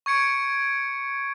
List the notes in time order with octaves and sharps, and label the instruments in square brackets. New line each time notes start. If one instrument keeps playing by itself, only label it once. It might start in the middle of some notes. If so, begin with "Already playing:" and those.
[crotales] C#6 G#6 C#7 D7